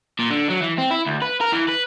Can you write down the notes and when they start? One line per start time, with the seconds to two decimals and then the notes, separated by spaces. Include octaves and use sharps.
0.19 A#2
0.30 D3
0.50 F#3
0.62 E3
0.78 C4
0.91 E4
1.07 D2
1.22 B4
1.41 A#4
1.52 E3
1.68 B4